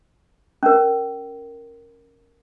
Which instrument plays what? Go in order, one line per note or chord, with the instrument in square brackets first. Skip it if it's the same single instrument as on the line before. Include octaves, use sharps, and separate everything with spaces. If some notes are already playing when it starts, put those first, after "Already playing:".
[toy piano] C#4 A#4